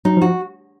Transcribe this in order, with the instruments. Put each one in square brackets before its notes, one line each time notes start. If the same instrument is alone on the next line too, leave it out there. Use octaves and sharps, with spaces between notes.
[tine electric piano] F#3 [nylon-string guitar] D#4
[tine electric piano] F3 [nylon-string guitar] F#4